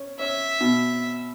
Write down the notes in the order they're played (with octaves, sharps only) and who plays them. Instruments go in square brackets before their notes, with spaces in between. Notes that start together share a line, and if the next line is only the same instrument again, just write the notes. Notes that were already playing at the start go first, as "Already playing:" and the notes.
Already playing: [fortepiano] C#4
[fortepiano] C#4 [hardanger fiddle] E5
[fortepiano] B2